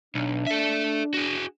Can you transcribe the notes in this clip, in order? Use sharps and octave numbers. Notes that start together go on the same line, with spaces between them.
B1 D4
A4 E5
F#4 G#4